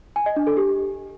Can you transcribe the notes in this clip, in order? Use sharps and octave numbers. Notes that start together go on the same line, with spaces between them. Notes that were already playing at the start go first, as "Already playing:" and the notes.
G#5
D#5
D4
A4
G4